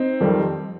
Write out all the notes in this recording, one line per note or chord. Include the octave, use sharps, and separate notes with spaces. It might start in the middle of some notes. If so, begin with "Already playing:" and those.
Already playing: C4 D#4
F2 D#3 G3